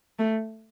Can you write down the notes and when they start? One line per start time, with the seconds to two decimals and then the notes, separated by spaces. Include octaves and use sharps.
0.19 A3